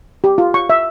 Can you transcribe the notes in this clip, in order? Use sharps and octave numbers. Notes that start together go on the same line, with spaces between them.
G4
F4
C#6
E5